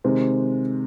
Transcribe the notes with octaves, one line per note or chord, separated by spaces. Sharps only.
C3 D#3 G#3 C4